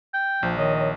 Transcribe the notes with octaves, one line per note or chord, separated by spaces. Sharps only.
G5
A#1 F3
D#3 C#5 D#5
C#5